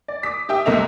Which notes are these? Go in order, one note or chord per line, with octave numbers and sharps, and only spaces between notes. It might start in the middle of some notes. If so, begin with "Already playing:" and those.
D5
D6 D#6 B6
G4 E5 G5 D#6
C2 C3 A3 D#5 E5 F7